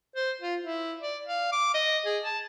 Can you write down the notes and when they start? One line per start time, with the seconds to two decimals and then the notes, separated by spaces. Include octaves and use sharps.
0.16 C5
0.41 F4
0.62 E4
1.01 D5
1.27 F5
1.52 D6
1.74 D#5
2.06 G#4
2.24 A5